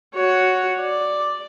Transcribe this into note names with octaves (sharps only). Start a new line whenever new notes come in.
F#4 C#5
D5